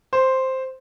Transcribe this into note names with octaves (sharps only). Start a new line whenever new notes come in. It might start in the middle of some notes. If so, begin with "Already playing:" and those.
C5